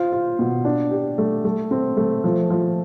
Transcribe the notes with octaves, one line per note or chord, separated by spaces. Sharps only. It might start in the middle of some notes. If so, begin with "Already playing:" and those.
Already playing: F4 C5
F4
B2
D4
G4
A3
A3
C4
A3
F3
F3